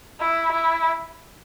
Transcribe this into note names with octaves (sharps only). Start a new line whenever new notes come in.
E4
E4